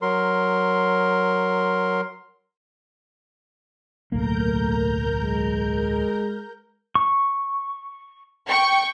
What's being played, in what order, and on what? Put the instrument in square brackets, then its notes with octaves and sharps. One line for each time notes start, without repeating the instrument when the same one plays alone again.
[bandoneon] F#3 A#4 C6
[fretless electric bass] D1 B1 A#3 [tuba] A3 [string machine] A#4 A#5 G6
[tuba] G#3
[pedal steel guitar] C#6
[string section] G5 C#6